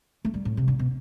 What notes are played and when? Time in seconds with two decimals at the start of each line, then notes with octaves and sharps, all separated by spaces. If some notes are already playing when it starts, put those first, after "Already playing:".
0.25 A3
0.34 G3
0.45 A2
0.57 C3
0.68 D3
0.79 B2